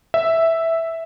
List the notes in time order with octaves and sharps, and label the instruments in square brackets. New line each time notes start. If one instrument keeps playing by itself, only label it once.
[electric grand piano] E5